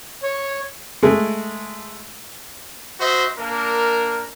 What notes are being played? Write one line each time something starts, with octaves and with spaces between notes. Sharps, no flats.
C#5
G#3 A3
F#4 C5 D#5 E5
A#3 D4 A#4